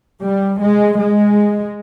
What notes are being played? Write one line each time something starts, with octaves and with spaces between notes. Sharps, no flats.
G3
G#3
G#3